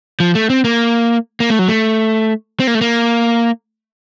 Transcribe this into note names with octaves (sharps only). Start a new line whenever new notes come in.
F3
A3
C4
A#3
A#3
A3
F#3
A3
C4
A#3
A3
A#3